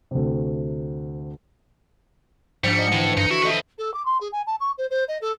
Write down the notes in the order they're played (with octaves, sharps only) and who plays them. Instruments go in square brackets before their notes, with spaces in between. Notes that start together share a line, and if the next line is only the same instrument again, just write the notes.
[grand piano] D2 C3
[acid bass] G#2 [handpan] F3 D4 [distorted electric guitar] G3 [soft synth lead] C#7
[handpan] D#5
[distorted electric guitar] A2 [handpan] D3 E3
[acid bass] G2 [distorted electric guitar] D#4
[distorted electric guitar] E4 [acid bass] F#4
[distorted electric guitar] C4 B4 [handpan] A4 D#5 E5
[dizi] A4
D6
C6
G#4
G#5
A5
C#6
C5
C5
D#5
A4